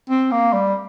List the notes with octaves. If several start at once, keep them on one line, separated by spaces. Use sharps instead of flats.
C4
A#3
G3